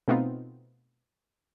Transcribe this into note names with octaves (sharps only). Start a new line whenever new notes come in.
B2 A3 B3 C4 D#4 F4